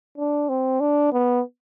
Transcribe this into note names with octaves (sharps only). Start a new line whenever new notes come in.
D4
C4
D4
B3